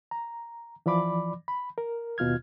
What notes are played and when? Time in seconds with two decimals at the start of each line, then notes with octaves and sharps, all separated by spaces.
0.11 A#5
0.86 E3 F3 D5 B5 D6
1.48 B5
1.78 A#4
2.18 D#2 B2 F4 F6 G#6